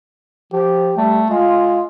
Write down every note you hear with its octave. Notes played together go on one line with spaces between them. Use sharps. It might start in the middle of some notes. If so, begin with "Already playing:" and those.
F3 G4
G3 A3
G#3 F4